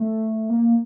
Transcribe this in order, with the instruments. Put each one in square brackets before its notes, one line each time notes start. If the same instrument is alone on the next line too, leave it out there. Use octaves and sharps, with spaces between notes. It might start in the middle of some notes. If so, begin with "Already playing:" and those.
Already playing: [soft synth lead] A3
A#3